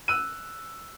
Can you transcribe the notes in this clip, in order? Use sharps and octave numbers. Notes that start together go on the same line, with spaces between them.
E6 F#6 D#7